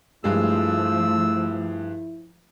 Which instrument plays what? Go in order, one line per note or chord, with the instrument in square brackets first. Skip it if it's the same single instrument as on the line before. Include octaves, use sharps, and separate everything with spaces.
[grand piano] G2 G#3 [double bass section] F3 A3 [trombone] E4 [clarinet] E6